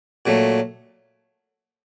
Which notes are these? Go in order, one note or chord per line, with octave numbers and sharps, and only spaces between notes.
A#2 F#3 A3